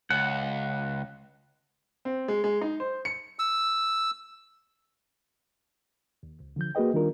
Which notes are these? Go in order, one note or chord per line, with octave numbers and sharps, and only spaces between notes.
C#2 F#5
C4
G#3
G#3
D#4
C5
C#7
E6
D#2
C#2
D3 F3 G6
A#3 F#4 G#4 B4 D#5 G5
D#3 G3 D4 F4 A#4